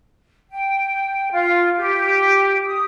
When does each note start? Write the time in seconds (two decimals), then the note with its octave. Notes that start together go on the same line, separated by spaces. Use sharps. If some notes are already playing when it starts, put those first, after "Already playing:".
0.51 G5
1.32 F4
1.77 G4
2.66 D#6